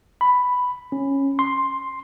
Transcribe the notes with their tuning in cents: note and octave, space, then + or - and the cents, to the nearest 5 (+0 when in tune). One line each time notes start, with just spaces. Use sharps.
B5 +5
C#4 -10
C6 +5